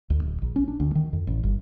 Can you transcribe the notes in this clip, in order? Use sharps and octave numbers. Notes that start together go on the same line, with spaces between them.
D2
D1
A#1
C#4
D4
D2
D#3
F2
A1
G1